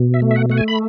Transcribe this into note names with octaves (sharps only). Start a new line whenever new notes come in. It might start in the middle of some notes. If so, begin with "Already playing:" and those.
Already playing: B2
E5
A3
E5
F#5
A3 F#5
G#5
B5